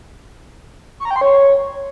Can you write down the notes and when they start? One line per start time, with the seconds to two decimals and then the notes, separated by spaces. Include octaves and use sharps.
1.00 C#6
1.05 A#5
1.11 G5
1.16 C6
1.21 C#5